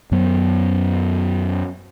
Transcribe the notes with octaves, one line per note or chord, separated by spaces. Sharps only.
F#2 F#3 B3